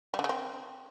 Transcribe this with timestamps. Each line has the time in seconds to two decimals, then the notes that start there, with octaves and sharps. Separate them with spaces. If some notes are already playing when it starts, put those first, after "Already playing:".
0.14 G3
0.19 D3
0.24 C#3
0.29 C4